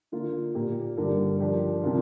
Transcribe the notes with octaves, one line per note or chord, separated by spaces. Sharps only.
D3 A#3 F4
A#2 A#3 G4 A#4
G2 D3 G3 D4 A#4
F3 D4 G4 A#4
C3 F3 D4 F4 A#4